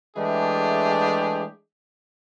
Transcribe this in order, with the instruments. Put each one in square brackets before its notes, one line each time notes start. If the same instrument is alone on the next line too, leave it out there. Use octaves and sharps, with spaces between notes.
[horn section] E3 G#3 A3 D4 G4 G#4